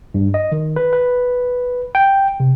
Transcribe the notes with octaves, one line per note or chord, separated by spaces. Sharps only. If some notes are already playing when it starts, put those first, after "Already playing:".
G2
D#5
D#3
B4
B4
G5
C3